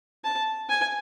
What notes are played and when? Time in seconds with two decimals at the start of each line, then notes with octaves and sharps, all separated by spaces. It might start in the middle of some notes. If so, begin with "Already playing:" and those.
0.24 A5
0.70 G#5